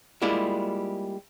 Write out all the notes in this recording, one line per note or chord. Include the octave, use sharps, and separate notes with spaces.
G3 G#3 A#3 E4 F4 G4